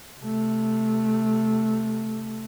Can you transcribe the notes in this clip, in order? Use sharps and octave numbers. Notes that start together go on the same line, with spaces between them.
C3 A3